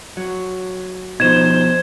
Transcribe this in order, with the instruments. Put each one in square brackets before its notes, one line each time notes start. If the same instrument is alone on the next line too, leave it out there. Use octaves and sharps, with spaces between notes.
[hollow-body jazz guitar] F#3
[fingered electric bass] B2 F3 [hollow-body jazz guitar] D#4 [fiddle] C5 [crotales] G#6 E7